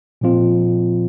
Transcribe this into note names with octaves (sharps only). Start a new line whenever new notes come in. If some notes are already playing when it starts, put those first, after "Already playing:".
A#2 F3 C4 F4